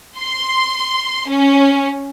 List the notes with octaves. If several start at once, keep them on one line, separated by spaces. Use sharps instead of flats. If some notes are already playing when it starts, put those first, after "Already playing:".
C6
C#4